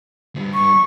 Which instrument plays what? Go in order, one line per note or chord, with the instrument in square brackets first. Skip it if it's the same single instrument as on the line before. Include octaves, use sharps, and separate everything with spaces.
[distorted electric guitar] D2 G2
[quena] C#6